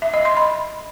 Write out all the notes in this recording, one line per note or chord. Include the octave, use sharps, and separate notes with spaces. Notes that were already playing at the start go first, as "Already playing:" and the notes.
E5
D#5
C6
B5